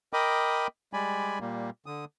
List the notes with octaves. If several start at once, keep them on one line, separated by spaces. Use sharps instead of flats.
A#4 D#5 G5 B5 D6 D#6
G3 G#3 D5 G#5 B5
A#2 G3 A#3
D3 D#6